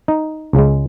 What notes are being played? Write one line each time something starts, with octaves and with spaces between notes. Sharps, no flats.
D#4
C#2 C#3 G#3